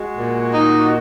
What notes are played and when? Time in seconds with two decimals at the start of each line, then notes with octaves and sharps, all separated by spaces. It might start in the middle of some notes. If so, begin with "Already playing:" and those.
Already playing: G#3 F#4
0.16 A#2
0.53 D#4